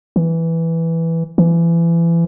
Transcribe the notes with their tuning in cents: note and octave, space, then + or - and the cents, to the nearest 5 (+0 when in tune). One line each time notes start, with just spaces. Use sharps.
E3 +0
E3 +30